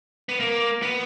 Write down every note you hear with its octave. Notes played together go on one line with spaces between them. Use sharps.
B3
A#3
B3